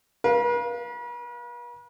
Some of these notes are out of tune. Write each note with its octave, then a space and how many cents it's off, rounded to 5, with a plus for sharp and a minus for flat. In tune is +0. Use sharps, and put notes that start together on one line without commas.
B4 -45 F5 -5